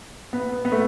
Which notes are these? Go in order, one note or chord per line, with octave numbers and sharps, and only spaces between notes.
B3
B3
A3